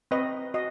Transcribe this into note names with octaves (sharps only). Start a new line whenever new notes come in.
C4 B4 D#5
F#4 D#5